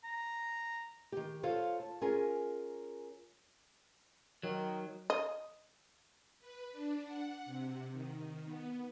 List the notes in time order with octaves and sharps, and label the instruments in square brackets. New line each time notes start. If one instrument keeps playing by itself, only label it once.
[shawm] A#5
[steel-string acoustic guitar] D#3 G4
F4 A4 C5 C#5 F5
A5
C#4 F4 G#4 A#4
[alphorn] D#3 [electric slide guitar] F#3
[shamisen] D#5
[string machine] B4
D4
F#5
C3
D#3
B3